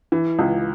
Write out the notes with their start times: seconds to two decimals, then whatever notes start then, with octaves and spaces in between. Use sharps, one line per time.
0.12 E3
0.39 C#2